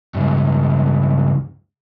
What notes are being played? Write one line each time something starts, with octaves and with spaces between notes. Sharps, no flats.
C#2 G2